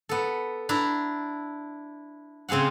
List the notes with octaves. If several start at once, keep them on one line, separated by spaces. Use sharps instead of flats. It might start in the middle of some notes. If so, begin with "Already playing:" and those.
B3 A4
D4 E4 A#5
C#3 C4 G#4 F5 F#5